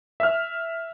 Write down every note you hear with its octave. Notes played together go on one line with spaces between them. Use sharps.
E5 F6